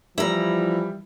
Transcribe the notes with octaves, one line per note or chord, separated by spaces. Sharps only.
E3 F3 G3 E4 A#5